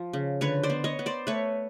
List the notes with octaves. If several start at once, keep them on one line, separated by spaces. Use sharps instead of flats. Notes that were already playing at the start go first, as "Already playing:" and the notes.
Already playing: F3
C#3
D3 B4 C#5
C5 D5
B3
C#5 D#5
B3
C5 D5
A3 B4 C#5